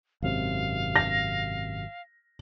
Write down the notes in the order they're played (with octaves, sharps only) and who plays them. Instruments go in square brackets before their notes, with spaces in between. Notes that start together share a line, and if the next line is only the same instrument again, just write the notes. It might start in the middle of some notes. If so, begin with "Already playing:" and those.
[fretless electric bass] G#1 F#2 C3 [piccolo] F5
[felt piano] A#6